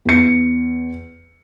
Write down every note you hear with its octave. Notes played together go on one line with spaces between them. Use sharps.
E2 C#7